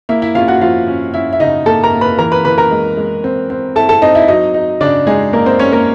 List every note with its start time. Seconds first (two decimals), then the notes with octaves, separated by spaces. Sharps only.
0.09 A#3 E4 E5
0.22 E4 E5
0.35 C#4 F4 F5
0.48 F#4 F#5
0.61 F3 F4 F5
0.87 C#4
1.14 C#4 E4 E5
1.33 E5
1.40 C#3 D#4 D#5
1.66 A#3 A4 A5
1.84 A#4 A#5
1.92 A#3
2.01 B4 B5
2.19 E3 A#4 A#5
2.32 B4 B5
2.45 E3 B4 B5
2.58 A#4 A#5
2.71 G#3
2.97 G#3
3.24 C4
3.50 C4
3.76 E4 A4 A5
3.89 A4 A5
4.02 C4 D#4 D#5
4.15 E4 E5
4.28 F#3 D#4 D#5
4.54 D#4
4.80 C#3 D4 D5
5.07 G#3 D#4 G#4
5.33 A#3 D#4 A#4
5.46 C4 C5
5.59 A#3 C#4 C#5
5.73 A#3 A#4